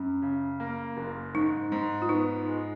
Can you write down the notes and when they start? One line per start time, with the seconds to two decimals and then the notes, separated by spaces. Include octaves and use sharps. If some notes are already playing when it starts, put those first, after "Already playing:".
Already playing: F#2 C#4
0.22 C#3
0.60 A#3
0.97 F#1
1.35 G#2 D#4
1.72 G#2
2.02 F4
2.09 B3 D#4
2.47 G#3